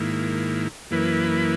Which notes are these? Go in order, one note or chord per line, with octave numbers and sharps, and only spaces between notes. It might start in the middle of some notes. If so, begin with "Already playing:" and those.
Already playing: G#2 D#3 A#3 E4
F#2 E3 A#3 E4 B4